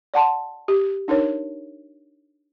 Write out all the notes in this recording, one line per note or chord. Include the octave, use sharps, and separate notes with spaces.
D5 F#5 A5 C6
G4
D4 D#4 A#4 C#5